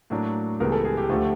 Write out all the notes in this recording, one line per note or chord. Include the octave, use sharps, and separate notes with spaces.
A2 F#3 A#3 D4
C#2 C#3 E3 G3 B3 A#4
A4
G#4
G4
D2 D3 F3 A3